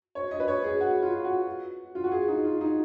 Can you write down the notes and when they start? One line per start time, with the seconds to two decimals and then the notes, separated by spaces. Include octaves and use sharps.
0.15 C#5
0.31 D#5
0.40 B4
0.48 C#5
0.64 G#4
0.81 F#4
1.02 F4
1.24 F#4
1.95 F4
2.04 F#4
2.12 G#4
2.28 D#4
2.45 F4
2.61 D#4